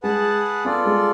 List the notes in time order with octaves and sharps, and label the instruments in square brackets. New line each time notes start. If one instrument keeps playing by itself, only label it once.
[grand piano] G#3 [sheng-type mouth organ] G#4 B4 F#5 A5
[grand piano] B3 [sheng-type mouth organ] F4 A4 D5
[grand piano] G#3